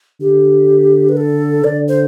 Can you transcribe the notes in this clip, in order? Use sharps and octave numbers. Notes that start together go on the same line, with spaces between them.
D3 G4
B4
A4
D3 D5
C5